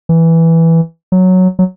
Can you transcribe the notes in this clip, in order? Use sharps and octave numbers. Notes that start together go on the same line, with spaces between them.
E3
F#3
F#3